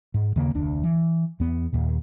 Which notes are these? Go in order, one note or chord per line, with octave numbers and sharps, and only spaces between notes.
G#2
D#2 C#3 A#3
F1 D2 D4
E3
E2 B3
D#2 A#2